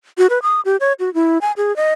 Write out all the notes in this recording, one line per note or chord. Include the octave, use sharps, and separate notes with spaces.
F#4
B4
D#6
G4
C#5
F#4
E4
G#5
G#4
D#5